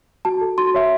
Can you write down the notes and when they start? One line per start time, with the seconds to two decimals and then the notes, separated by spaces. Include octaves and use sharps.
0.25 F#4 A5
0.41 A4
0.58 F#4 C6
0.74 C#5 E5